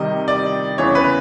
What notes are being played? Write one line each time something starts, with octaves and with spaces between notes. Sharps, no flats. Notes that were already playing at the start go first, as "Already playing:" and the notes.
Already playing: C3 D#3 G3 D#5
D5
E2 C#3 E3 C#5
B4